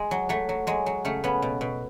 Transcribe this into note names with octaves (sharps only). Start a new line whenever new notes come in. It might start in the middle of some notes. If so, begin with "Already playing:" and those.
Already playing: G#3
F#3
F#3 A3
F#3
F#3 G#3
F#3
C#3 A3
C#3 B3
B2
B2